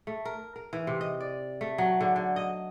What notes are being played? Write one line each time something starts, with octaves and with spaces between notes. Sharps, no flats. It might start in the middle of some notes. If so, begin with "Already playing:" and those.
A3
A#4
A#4
E3
C3
D#5
D5
A3
F#3
D3
D3
D#5